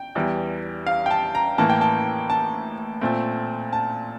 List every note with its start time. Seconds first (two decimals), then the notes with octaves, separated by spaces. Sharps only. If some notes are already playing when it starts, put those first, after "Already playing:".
Already playing: G5
0.15 E2 E3 G3
0.87 F5
1.06 G5
1.11 A5
1.35 A#5
1.58 A2 E3 A#3 A5
1.70 G5
1.81 A5
2.30 A5
3.01 A#2 A3 C4
3.73 A5